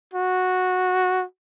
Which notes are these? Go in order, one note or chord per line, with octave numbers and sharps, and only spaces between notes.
F#4